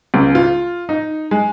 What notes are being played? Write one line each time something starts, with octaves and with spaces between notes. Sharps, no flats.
C#2
F4
D#4
G#3